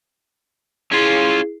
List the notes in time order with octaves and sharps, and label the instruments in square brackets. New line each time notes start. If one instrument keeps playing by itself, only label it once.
[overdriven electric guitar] C#4 F4 [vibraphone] E4 G#4